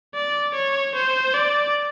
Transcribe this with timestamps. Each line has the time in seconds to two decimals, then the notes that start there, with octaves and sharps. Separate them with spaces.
0.15 D5
0.55 C#5
0.95 C5
1.34 D5